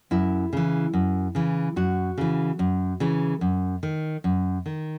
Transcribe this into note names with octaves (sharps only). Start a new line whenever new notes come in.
F#2 E4
C#3 E3
F#2
C#3 E3
F#2 F#4
C#3 E3
F#2
C#3 E3
F#2
D#3
F#2
D#3